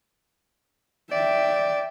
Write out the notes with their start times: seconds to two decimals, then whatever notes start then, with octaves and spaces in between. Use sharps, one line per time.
1.11 D5 E5 G5